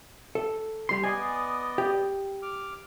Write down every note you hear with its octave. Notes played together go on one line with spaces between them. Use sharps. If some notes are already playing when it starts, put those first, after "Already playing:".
A4
G3 C6
B3 D5 D#5 G#5
G4
D6 F6